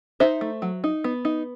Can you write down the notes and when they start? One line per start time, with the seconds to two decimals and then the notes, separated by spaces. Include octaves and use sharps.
0.20 D#4 C5 E5
0.41 A3
0.62 F#3
0.84 D#4
1.04 B3
1.25 D#4